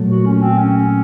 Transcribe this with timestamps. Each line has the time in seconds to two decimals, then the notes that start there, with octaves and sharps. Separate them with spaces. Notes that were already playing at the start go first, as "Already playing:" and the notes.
Already playing: A#2 F#3 A3
0.10 F#4
0.26 C#4
0.42 C4
0.58 C#4